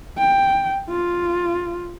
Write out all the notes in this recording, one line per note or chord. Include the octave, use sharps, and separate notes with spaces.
G5
F4